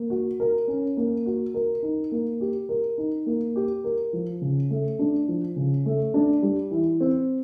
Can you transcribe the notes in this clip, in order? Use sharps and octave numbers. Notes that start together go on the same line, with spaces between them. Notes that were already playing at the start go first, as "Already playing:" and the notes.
Already playing: A#3
F#4
A#4
C#4
A#3
F#4
A#4
D#4
A#3
G4
A#4
D#4
A#3
G4
A#4
F3
C#3
A3
D4
F3
C#3
A3
D4
G3
E3
C4